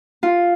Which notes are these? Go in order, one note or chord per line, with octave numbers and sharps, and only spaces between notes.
F4